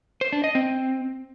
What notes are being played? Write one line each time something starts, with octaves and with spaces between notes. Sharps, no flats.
C5
D4
D#5
C4